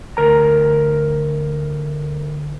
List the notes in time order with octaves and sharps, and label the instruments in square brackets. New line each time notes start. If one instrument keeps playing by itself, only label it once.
[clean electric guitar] D2 A#4 A#5